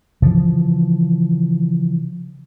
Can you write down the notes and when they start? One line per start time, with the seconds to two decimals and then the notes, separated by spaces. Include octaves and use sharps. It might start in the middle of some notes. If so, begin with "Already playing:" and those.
0.22 C#3 E3 F3